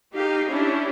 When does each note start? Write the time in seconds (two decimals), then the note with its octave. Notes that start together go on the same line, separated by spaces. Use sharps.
0.13 D#4 G4 F5
0.48 C#4 D4 E4 G4